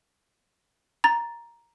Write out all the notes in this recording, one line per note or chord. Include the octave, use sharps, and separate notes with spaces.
A#5 A6